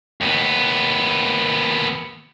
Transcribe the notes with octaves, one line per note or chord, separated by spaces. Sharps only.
D#2 B3